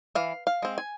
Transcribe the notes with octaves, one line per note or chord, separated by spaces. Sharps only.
E3 F5
F5
G#3 C4
G#5